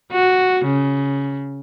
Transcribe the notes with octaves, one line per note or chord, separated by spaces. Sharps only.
F#4
C#3